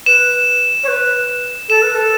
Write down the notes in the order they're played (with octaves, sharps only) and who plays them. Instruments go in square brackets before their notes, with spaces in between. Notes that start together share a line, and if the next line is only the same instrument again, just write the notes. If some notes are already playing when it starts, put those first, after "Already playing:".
[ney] B4 [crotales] E7
[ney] C#5
B4
[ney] A4 [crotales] E7
[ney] B4
A4